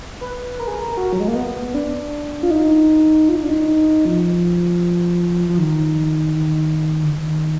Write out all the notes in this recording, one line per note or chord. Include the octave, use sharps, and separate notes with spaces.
B4
A#4
G#4
A#4
F#4
F#3
G#3
A#3
B3
D4
F4
D#4
F4
D#4
D4
D#4
F3
F3
D#3
D#3
D3
D#3